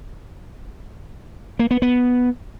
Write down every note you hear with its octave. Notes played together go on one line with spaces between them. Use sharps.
A#3
B3
B3